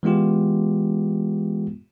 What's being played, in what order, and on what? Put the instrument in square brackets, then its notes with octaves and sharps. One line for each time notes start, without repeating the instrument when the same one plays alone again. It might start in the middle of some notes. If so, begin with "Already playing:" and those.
[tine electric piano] E3 G#3 B3 F4 G4